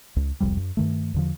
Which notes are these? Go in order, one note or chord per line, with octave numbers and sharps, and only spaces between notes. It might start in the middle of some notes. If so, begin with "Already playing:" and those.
C#2
E1 C2 F2 G3
F#2
G2 D#3 A3
E2 D3 F3